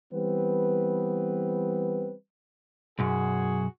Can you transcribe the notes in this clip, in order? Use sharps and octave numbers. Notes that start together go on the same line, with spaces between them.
E3 G3 B3 C4 B4
B1 F#2 F#4 G#4